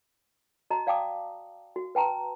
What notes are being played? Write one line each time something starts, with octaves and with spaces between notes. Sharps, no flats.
F#4 D#5 A5 A#5
D5 F5 G5 A5 D6 D#6
F#4
B4 G5 A5 A#5 C6